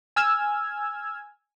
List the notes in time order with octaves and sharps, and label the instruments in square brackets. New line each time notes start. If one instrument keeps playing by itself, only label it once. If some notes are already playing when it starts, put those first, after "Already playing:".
[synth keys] G#5 E6 F6 G#6